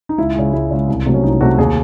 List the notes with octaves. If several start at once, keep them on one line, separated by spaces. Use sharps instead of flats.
D#4
C#2 E4
C#3 G#3
C#2 E4
C#3 G#3
C2
C3 F#3 A3
C#4
C2 D#4
C3 F#3 A3 F#4
D#2 G#4